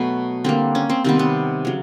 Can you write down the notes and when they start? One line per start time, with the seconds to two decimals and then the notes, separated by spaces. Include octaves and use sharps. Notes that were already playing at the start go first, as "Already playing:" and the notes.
Already playing: B2 F#3 A3 B3
0.44 D3 G3 A#3 C4
0.75 C#4
0.89 C4
1.04 C3 D#3 G3 B3 C4
1.19 B3
1.65 C#3 F#3